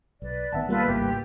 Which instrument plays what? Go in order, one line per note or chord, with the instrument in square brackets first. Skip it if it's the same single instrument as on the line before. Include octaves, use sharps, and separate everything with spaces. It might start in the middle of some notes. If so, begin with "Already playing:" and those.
[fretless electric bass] B1 [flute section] B4 D5
[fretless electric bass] A1 D#3 B3 [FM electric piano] E5 F#5 A5
[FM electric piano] G3 A#3 [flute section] F4 A4 B4
[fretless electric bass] G#1 C#2 A2 [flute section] G4